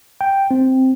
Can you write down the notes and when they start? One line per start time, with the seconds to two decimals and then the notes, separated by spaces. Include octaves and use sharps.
0.21 G5
0.51 C4